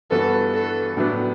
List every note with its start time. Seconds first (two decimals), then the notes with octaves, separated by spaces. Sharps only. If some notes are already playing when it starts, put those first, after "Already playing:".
0.11 G2 E3 B3 F#4 A4 B4
0.54 A4
0.97 A2 F#3 B3 D4